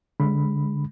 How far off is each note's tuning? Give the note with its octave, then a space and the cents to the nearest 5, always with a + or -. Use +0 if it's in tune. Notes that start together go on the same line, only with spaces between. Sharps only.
D3 -20 G#3 -15 B5 +0